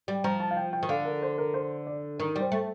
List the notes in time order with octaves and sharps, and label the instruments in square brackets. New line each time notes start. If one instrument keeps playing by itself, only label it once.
[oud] G3
[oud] F3 [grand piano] A#5
[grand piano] A5
F5
G5
G5
[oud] D#3
[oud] D3 [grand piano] F5
[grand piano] A#4
C5
A#4
C5
D5
[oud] D#3 [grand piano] A#4
[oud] G3
[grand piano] C5
[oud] A3